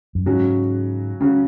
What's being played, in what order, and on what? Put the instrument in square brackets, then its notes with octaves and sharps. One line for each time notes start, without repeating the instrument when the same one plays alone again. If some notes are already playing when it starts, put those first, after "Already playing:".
[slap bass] F#2
[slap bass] G#2 [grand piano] C#3 F#3 C#4 F#4
[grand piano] C#3 F#3 C#4 F#4